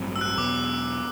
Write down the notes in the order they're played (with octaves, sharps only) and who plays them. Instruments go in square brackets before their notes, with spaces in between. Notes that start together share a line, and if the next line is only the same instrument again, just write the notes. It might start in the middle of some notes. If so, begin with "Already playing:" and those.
Already playing: [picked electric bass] A1 G2 F#3 C4
[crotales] E6
F#6
[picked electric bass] E2 B2 F#3 B3 [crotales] D6